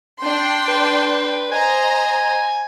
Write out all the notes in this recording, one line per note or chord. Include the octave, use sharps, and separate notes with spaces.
D4 G5 C6
B4
C5 D#5 G#5 A#5